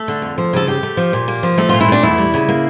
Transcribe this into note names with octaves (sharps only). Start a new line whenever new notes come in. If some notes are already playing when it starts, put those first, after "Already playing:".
Already playing: A3 A4
D3
F2
F3
C#3 A4
G2 G4
A3
F3
A#2
A#3
F3
A3 A4
A#2 F4
E4
A3 D4
E2 E4
G3
C#3
A#3